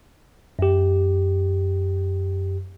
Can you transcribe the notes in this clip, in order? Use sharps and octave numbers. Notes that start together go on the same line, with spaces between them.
F#2 G4